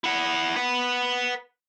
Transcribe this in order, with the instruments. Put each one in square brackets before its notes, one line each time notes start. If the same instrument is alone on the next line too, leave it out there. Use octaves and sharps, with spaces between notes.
[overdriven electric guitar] E4 F#5
B4 F#5